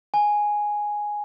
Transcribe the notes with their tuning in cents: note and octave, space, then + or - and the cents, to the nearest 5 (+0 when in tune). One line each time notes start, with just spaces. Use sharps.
G#5 +0